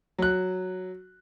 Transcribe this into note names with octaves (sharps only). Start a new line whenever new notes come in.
F#3 F#6